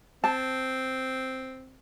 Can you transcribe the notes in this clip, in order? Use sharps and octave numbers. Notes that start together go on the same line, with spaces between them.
C4 A5